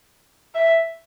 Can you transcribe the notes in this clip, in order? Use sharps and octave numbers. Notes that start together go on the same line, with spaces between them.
E5